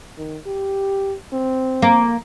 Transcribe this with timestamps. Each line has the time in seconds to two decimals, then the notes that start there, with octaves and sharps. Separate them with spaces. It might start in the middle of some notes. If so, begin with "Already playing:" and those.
0.18 D#3
0.47 G4
1.33 C4
1.82 A#3